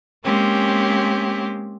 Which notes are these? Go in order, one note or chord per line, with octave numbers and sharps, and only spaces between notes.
G#3 A#3 C4 C#4 G4